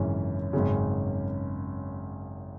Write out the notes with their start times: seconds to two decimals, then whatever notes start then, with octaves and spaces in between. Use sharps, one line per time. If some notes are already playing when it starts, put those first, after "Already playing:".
Already playing: G#1 F#2 C#3 E3 C#4
0.53 G#1 F#2 C#3